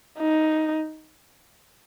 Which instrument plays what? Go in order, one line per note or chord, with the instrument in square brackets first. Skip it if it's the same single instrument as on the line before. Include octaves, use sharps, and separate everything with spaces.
[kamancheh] D#4